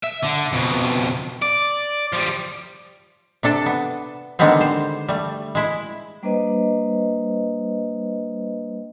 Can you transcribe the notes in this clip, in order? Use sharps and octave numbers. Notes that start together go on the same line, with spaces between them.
E5
D3
F2 B2
D5
F3 G3
C3 D4 A4
B3
D3 D#3 G3 G#3 B3 C4
C5
G3 A3
G#3 E4
G3 A#3 D4 B4 C5 D#5